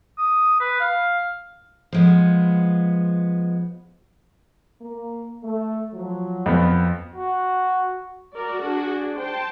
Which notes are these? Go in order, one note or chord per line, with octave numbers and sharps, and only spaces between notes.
D#6
B4
F5
F3 G#3 B3
A#3
A3
F3 F#3
F2 B3
F#4
F#4 A#4 D5
D4 G#4
C5 G5 A5